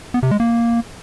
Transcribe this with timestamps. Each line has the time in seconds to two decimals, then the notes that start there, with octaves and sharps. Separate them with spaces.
0.14 B3
0.23 C3
0.31 G#3
0.40 A#3